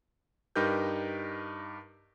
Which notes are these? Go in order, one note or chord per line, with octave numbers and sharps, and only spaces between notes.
G2 D#4 G4 A#4 B4 G6